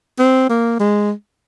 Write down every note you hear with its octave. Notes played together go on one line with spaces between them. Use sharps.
C4
A#3
G#3